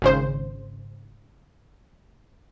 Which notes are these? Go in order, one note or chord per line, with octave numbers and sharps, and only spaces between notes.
G#1 C#3 C5